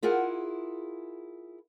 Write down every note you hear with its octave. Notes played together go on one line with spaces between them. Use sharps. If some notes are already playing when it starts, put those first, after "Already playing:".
E4 F4 G#4 A#4 F#5